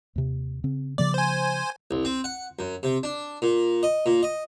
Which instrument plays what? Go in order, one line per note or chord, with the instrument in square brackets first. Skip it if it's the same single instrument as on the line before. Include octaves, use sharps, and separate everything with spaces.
[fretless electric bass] D#2 C3
C#3 C4
[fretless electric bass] C#3 F3 A#3 [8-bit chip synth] D5
[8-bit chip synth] C5 G#5
[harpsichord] C2
C4
F#5
F#2
C3
D4
A#2
D#5
A#2
D#5